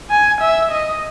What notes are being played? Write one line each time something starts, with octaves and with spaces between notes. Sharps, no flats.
G#5
E5
D#5